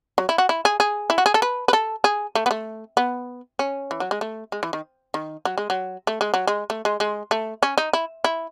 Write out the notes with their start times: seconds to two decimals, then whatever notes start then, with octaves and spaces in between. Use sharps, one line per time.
0.18 F#3
0.29 E4
0.38 F#4
0.49 E4
0.65 G#4
0.80 G#4
1.10 E4
1.18 F#4
1.26 G#4
1.34 A4
1.42 B4
1.68 B4
1.73 A4
2.04 G#4
2.35 A3
2.46 B3
2.51 A3
2.97 B3
3.59 C#4
3.91 E3
4.00 F#3
4.11 G#3
4.21 A3
4.52 G#3
4.63 E3
4.73 D#3
5.14 D#3
5.45 F#3
5.58 G#3
5.70 F#3
6.07 A3
6.21 G#3
6.34 F#3
6.47 G#3
6.70 A3
6.85 G#3
7.00 G#3
7.31 A3
7.63 C#4
7.78 D#4
7.93 E4
8.24 E4